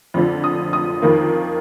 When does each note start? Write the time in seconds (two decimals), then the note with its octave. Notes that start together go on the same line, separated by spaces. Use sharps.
0.14 F2 D3 F3
0.44 D#6
0.73 D#6
1.02 F2 D#3 A#3